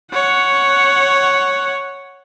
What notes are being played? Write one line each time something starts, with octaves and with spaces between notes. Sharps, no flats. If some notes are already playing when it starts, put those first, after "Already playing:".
C#5 F#5